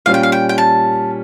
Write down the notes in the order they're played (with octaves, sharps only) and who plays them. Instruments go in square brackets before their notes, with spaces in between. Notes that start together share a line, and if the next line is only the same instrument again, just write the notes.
[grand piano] A#2 G3 C#4 F4 [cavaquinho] F5
[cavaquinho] G5
F5
G5
G5
A5